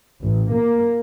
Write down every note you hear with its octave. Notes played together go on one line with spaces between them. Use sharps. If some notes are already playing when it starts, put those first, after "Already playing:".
A1
A#3